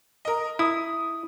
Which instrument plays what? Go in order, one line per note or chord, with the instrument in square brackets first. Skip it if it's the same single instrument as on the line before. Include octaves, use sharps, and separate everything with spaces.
[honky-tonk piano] A#4 D#5
[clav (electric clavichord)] E4 [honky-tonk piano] D#6